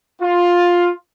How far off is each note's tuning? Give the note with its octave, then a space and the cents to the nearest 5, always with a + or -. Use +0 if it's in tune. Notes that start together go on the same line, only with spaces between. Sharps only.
F4 +10